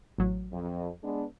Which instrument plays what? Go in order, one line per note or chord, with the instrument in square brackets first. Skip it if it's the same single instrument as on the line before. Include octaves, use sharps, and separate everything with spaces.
[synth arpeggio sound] A1 F#3
[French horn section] F2
G#3 B3 D4